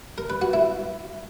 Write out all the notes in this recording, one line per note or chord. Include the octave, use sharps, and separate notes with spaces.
A#4
B4
F#4
E4